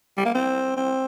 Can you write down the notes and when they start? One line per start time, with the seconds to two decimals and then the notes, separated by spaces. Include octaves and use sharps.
0.17 G3
0.26 A#3
0.35 C4
0.76 C4